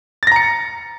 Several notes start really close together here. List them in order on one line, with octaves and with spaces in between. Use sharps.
A6 A#6 A#5 C#7